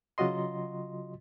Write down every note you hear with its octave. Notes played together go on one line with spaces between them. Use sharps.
C#3 F#3 F4 F#4 D#5 C6